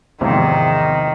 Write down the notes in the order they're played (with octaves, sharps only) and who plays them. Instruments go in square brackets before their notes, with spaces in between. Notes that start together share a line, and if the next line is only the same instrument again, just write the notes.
[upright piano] E2 G#2 [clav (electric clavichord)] C3 F3 [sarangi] D#3